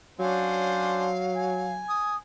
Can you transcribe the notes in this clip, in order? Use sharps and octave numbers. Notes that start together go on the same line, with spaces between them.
F#3 C#4 D4 C5 F5
G#5
D#6